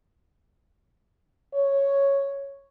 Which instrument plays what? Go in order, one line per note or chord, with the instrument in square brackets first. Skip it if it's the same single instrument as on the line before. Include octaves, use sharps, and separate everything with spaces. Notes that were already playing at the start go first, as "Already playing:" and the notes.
[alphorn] C#5